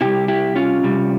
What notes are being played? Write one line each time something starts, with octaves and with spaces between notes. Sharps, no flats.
C3 G3 E4 G4
E4 G4
C#4 F4
C3 G3